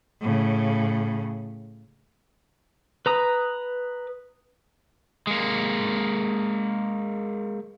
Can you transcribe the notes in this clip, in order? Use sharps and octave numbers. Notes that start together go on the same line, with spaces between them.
A2 C#3
B4 A#5 D#6
G#3 A#3